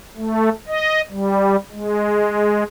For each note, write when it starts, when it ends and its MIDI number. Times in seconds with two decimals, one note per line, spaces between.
0.17 0.50 57
0.68 1.01 75
1.10 1.56 55
1.71 2.63 56